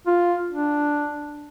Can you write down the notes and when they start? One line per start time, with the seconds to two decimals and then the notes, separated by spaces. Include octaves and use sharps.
0.07 F4
0.51 D4